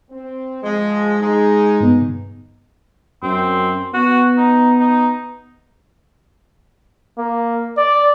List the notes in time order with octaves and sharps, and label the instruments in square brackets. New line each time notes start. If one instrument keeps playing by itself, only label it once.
[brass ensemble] C4
[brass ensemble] F3 [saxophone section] G#3
[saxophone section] G#3 [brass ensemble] D#4
[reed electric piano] G2 B3
[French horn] F#2 [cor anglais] C4
[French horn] B3 [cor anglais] F#4
[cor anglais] D#4
D#4
[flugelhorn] A#3
D5